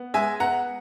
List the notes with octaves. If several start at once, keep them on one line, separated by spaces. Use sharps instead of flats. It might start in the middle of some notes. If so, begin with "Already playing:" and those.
Already playing: B3
G#3 E5 G#5
B3 F#5 A#5